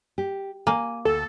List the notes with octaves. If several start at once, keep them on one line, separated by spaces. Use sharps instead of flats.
G4
A#3 G#5
D2 A4